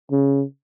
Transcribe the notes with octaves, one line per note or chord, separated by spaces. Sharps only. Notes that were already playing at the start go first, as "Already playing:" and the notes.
C#3